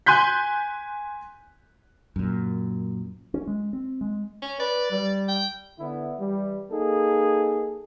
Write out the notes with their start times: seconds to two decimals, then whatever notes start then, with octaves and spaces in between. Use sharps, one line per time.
0.06 G#5 C6 F#6 G6 B6
2.16 F#2 A#2
3.34 C#4
3.47 G#3
3.73 C4
4.01 G#3
4.42 C#4
4.60 B4 D5
4.91 G3
5.28 G5
5.79 D3 B3 D4 E4
6.19 E3 G3
6.71 A#3 D#4 G#4 A4